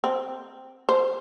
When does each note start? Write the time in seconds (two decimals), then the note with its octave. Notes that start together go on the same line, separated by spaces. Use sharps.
0.04 C4
0.89 C5